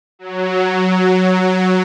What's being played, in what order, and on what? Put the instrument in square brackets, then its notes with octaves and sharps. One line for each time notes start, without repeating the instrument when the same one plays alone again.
[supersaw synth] F#3